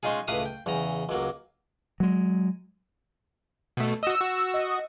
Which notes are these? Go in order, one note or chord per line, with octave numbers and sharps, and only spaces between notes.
G#3 C#4 D#4 F4 G#4
C#2 A2 B4 F5 D#6
G5
E2 C#3 A#5
C#2 F#3 A#3
F#3 G#3
B2 A3
F#4 D#5 E6
F#4
D#5